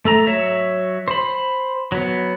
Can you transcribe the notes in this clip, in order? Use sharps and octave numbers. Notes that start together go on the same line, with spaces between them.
A3 A4 A#5
F#3 C#5 E5
C5 B5
F#3 B3